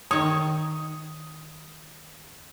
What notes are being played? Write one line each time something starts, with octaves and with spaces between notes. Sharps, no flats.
D#3 C#5 D#6